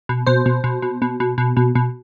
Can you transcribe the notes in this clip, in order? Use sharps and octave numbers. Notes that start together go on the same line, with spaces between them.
B2
B2 C5
B2
B2
B2
B2
B2
B2
B2
B2